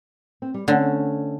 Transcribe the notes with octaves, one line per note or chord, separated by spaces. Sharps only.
C4
G3
D3 A3 C4 C#4